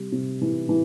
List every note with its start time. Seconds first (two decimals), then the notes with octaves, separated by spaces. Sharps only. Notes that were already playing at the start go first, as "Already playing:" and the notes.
Already playing: C3 G3
0.12 C3
0.41 E3
0.69 E3